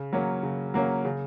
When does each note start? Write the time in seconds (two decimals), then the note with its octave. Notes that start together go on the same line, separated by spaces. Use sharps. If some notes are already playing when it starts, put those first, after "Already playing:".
Already playing: C#3
0.13 F#3 A#3 C#4
0.43 C#3
0.74 F#3 A#3 C#4
1.05 C#3